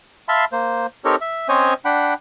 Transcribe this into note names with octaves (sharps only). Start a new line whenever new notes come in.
E5 F5 A5 B5 C6
A#3 C5
C4 D#4 G4 A4 A#4 C#5
E5
C4 C#4 C5 C#5 D#5 G#5
D4 F#5 G5 B5